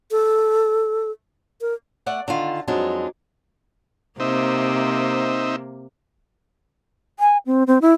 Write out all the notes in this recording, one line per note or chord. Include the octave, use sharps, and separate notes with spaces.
A4
A#4
A3 D5 F#5
D3 D#3 F4
F2 F#3 G#3 D4 D#4
C3 A#3 C4 D#4 E5
G#5
C4
C4
E4